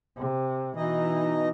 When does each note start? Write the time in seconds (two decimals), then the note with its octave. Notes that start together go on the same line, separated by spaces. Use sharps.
0.17 C3
0.76 B2 E3 D#4 D#5